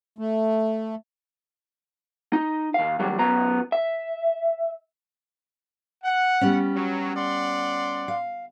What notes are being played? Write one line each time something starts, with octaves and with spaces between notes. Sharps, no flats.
A3
D#4
D#2 F5
D#2 F#3 G3
F#2 B3 A#5
E5
F#5
G3 B3 C#4
F#3
D5 F#5 C6
F5